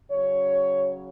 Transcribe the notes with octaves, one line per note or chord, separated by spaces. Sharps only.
C#3 F#3 C#4 C#5